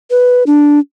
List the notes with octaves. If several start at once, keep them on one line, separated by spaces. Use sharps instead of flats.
B4
D4